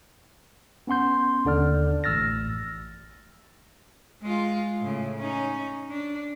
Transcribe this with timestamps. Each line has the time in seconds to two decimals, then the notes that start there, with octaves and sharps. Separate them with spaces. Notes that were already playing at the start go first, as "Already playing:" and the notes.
0.87 B3 C#4 F#5 C6 G6
1.45 D#2 D3 D5 F6
2.04 A1 E6 F6 A6 A#6
4.22 G#3 F4
4.80 A2 C#3
5.18 C#4 D#4
5.89 D4